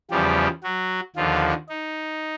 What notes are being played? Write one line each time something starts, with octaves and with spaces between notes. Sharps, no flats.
E2 C#3 F3 G3 G4
F#3 F#4
D#2 D3 F3 F4
D#4